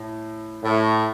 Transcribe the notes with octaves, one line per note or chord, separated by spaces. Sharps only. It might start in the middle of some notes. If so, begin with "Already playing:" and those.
Already playing: A2
A2